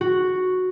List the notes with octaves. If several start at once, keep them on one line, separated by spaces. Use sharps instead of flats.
F#4